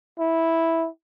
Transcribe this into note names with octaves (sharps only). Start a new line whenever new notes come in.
E4